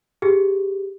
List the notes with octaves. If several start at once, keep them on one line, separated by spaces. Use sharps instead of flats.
G4 G#4